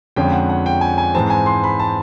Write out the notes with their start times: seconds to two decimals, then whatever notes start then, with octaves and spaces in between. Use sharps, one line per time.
0.16 F2 D3 F3 G#3 C#4 G5
0.32 F#5
0.49 F#5
0.66 G5
0.81 G#5
0.98 G#5
1.14 G#2 E3 G#3 C4 A5
1.30 G#5
1.46 C6
1.64 B5
1.80 A5